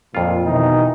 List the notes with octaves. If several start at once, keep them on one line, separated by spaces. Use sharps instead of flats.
F2 A#2 F4
B2 D#3 E3 D#4